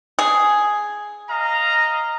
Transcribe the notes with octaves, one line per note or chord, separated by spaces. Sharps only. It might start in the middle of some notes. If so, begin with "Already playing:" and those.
G#4
D#5 F5 A#5